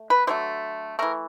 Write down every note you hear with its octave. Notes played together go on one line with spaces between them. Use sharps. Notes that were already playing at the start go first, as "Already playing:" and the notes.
Already playing: A3
B4
D3 F#3 A3 C5
E3 A3 A#4